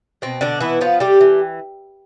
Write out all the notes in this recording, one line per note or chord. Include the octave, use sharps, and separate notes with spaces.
B2 C4
B2 D3 D4
E3 B3 E4
F3 B3 F4
G3 A3 G4
E3